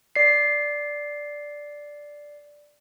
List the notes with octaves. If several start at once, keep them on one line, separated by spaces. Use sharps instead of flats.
D5 C7